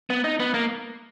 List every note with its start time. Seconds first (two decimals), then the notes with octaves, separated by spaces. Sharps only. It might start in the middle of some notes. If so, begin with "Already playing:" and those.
0.10 B3
0.24 D#4
0.40 B3
0.54 A#3